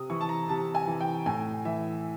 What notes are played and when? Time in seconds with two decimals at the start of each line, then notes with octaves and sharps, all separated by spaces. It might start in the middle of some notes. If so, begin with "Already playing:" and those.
Already playing: C3 D#6
0.10 E3 C#6
0.21 A5
0.29 A#5
0.48 C3 A5
0.75 G#5
0.87 E3
1.01 G5
1.26 A2 G#5
1.65 E3 E5